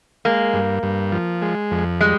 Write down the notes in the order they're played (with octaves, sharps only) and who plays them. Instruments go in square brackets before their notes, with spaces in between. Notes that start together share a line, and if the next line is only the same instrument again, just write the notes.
[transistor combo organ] G#3 [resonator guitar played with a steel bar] A#3
[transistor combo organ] G2
G2
F3
G#3
F2
[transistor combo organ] G3 [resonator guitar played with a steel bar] G#3